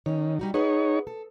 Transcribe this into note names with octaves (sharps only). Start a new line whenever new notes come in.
D#3 C#4 C#5
G3 D#4 F#4
D#4 G#4 B4 C#5 F#5
A4